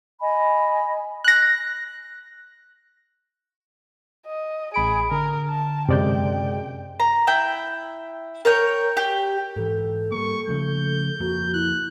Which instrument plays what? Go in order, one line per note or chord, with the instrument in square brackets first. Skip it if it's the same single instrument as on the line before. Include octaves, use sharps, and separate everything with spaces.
[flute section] D#5 G#5 B5
[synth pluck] F#6 A#6
[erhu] D#5
[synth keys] A1 B5 D7 [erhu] G#4
[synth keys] D3 [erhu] A#4
[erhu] A5
[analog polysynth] F#2 G#3 [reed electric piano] C3 D5 G6 [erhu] G5
[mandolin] A#5
E4 G5
A#4 C#5 G5
G4
[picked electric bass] G#2 E3 [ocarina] A4
[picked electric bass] G3 A#3 [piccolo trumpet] C#6
[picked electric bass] C#3 F3 A3 [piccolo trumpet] G6
[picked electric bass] F2 F3 A#3 [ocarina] F#4
[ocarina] E4 [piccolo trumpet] F#6